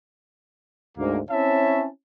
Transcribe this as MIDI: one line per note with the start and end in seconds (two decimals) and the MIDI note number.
0.98 1.19 38
0.98 1.19 44
0.98 1.19 58
1.31 1.87 60
1.31 1.87 61
1.31 1.87 64
1.31 1.87 73
1.31 1.87 76
1.31 1.87 81